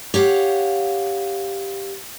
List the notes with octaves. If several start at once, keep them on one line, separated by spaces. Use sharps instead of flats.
G4 C#5 F5 F#5